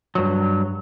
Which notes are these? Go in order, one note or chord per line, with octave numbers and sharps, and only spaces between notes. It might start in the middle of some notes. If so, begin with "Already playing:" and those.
G2 F#3